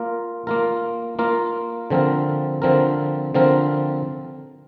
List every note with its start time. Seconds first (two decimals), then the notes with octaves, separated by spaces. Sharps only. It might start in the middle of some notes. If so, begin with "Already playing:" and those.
Already playing: A#3 F4 A#4
0.47 A#3 F4 A#4
1.19 A#3 F4 A#4
1.90 D3 F3 C4 A#4
2.62 D3 F3 C4 A#4
3.34 D3 F3 C4 A#4